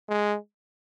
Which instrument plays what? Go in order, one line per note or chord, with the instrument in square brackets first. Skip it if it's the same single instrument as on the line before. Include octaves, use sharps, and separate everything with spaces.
[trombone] G#3